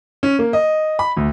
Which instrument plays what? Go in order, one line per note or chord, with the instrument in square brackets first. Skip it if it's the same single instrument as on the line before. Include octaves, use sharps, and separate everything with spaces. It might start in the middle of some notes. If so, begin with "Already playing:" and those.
[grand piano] C#4
A#3
D#5
B5
D2